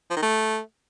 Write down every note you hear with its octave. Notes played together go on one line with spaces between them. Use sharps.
F3
D#3
A3